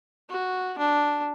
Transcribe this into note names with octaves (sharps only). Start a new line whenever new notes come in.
F#4
D4